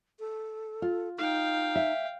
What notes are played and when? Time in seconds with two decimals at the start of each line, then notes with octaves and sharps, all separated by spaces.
0.19 A4
0.82 F4
1.18 D#4 F5 G5
1.75 E5